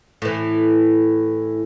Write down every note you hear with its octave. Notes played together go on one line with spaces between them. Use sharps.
A2 E3